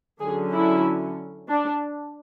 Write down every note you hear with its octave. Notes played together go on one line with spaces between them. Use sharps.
D3 F#3 C#4 G#4
E4
D4